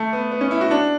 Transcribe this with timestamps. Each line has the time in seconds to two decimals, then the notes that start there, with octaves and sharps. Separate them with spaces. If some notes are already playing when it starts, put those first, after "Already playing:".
Already playing: A3
0.13 B3
0.31 B3
0.41 C#4
0.51 E4
0.61 F#4
0.71 D4